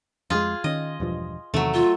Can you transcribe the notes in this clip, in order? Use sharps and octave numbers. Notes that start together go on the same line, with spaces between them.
F2 G#3 F4 G#4
D#3 C#4 D#5
E1 G2 F3
E2 C3 D#3 F#3 A3
F4